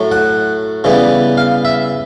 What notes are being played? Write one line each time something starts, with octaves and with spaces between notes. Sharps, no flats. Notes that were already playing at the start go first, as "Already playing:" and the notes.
Already playing: A2 F#3 A3
F#5
C#3 E3 G3 B3
F5
E5